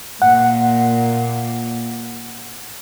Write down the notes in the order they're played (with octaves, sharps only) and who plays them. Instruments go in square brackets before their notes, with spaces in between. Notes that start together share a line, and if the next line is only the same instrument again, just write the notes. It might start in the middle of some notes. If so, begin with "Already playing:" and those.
[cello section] A#2 [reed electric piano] F#5